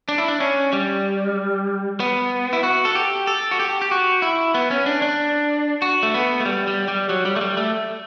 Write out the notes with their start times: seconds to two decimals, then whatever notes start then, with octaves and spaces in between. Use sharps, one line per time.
0.09 D4
0.18 E4
0.28 D4
0.40 C#4
0.73 G3
2.00 B3
2.53 E4
2.63 F#4
2.85 A4
2.95 G4
3.27 A4
3.51 F#4
3.60 G4
3.82 G4
3.91 F#4
4.22 E4
4.54 B3
4.71 C#4
4.86 D4
5.02 D4
5.82 F#4
6.03 A3
6.14 B3
6.40 A3
6.45 G3
6.67 G3
6.88 G3
7.09 F#3
7.25 G3
7.36 A3
7.41 G3
7.57 A3